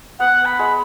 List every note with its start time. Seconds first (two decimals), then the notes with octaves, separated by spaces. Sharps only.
0.19 B3 F#5
0.45 B5
0.59 G#3